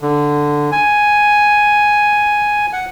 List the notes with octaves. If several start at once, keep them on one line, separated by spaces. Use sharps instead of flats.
D3
G#5
F#5